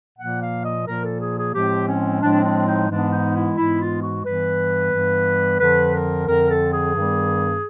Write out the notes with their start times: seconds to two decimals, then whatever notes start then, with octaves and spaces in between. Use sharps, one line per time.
0.18 A#2 F3 A#3 F#5
0.41 F5
0.64 D#5
0.86 A#2 F3 A#3 A#4
1.03 A4
1.20 G#4
1.37 G#4
1.54 A2 F3 G#3 C4 G4
1.88 C#4
2.21 A2 F3 G#3 C4 D4
2.45 D4
2.67 D#4
2.89 G#2 E3 G#3 B3 D4
3.12 D#4
3.35 E4
3.57 G#2 E3 G#3 B3 E4
3.79 F4
4.02 F#4
4.25 G2 E3 G3 B3 B4
4.92 G2 E3 G3 B3
5.60 F2 D3 F3 B4
5.94 A#4
6.27 F2 D3 F3 A#4
6.50 A4
6.72 G#4
6.95 G2 D#3 G3 B3